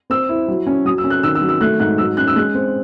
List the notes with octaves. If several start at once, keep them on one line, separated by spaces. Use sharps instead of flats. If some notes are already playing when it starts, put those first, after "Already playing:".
C4 E6
E4
F#3
C#4
F#3 D#6
E6
C#4
F#6
D#3 E6
E6
F#3
E6
A3 F#6
G#2 F#6
F#3 E6
C#4 F#6
E6
G#3 F#6
C4